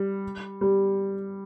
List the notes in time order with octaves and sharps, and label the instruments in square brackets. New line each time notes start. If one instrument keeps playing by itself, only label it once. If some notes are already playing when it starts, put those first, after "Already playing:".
Already playing: [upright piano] G3
G3